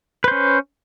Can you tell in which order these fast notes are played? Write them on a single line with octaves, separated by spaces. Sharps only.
B4 C5 C#4